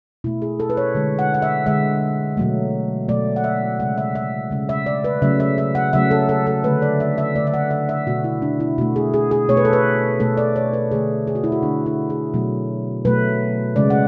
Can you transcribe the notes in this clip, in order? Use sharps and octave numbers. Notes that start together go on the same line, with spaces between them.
B2 A3 E4
G#4
A4
B4
C#5
D3 G#3
F#5
F#5
E5
D3 G#3 E5
B2 F#3 A3
B2 F#3 A3 D5
F#5
E5
C#3 G#3 F#5
E5
E5
C#3 G#3
E5
D5
B4
C#3 F#3 A3 E5
E5
E5
F#5
C#3 F#3 A3 E5
A4
A4
A4
D3 A3 B4
D5
E5
E5
D3 A3 D5
E5
F#5
E5
E5
B2 A3 F#4
E4
D4
E4
B2 A3 F#4
G#4
G#4
G#4
B2 A3 C#5
B4
A4
B4
B2 A3 A4
D5
C#5
B4
D3 A3 G#4
G#4
F#4
E4
F#4
D3 A3 D4
E4
G#4
B2 F#3 A3
B2 F#3 A3 B4
C#3 G#3 D5
F#5